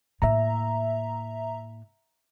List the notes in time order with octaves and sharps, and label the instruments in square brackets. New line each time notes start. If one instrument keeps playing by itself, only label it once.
[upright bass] A2 A#3 [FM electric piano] E5 A#5